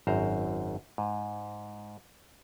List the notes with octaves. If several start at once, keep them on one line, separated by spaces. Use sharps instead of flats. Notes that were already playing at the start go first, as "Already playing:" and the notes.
G#1 F#2 C5 A#5
G#2